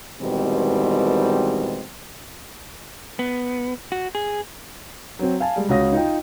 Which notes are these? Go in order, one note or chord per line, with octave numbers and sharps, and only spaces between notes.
B2 D#3 E3 G3 G#3 C4
B3
F#4
G#4
F#3 C4
F5 G#5 A5
G3 G#3
C#2 C#4 F#4 F5 D#6 A#6
D#4 F4 G5